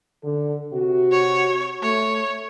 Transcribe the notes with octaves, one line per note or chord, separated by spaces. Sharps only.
D3 A4
C3 F#4
C#5
A3 C#5